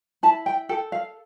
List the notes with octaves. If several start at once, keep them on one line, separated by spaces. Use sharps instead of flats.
E4 A5
G5
A4 G5
F5